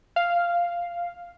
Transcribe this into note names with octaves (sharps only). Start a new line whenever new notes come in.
F5